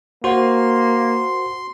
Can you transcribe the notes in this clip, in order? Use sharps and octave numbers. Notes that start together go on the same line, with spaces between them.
A#3 F#4 C5 C6